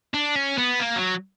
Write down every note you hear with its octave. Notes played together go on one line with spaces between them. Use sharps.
D4
C#4
B3
A#3
F#3